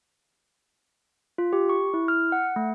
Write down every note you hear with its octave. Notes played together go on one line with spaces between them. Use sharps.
F4
G4
C#6
E4
F6
F#5
A3